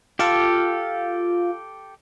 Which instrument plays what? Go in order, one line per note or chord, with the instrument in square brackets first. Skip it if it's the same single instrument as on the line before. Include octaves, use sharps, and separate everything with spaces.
[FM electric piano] F4 F5 [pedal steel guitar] G4 A4